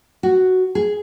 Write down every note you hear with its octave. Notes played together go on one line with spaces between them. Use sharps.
F#4
G#4